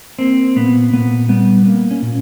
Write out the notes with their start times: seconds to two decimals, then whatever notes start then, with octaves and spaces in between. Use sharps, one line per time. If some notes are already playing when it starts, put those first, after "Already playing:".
0.19 A#3 C4
0.56 A#2 B3
0.93 A#2 B3
1.29 G3 B3
1.66 A#3
1.91 C#4
2.02 A#2